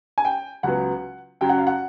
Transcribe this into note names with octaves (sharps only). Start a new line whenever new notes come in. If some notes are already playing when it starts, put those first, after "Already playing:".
G#5
G5
C#2 C#3 F#3 B3 F#5
F#2 C#3 F#3 G5
F#5
F5
F#5